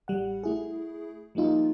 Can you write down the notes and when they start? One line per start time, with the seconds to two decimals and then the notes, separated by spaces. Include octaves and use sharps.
0.08 A1 G3 F#5
0.43 A3 E4 G#4
1.35 F3 G3 A#3 D#4 F4